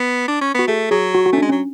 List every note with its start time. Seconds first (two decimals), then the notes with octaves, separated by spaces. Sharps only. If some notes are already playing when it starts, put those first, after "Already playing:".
Already playing: B3
0.28 D4
0.41 C#4
0.55 B3 F#4
0.67 A3 G#4
0.91 F#3 G#4
1.15 F#4
1.26 F#4
1.33 A3 C#4
1.38 D4
1.42 G#3
1.49 F#3 C#4